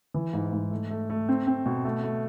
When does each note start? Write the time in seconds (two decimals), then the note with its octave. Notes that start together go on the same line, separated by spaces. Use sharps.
0.14 E3
0.33 G#2
0.52 G#2
0.71 A3
0.90 A3
1.10 A3
1.29 C4
1.47 C4
1.66 B2
1.85 A3
2.04 A3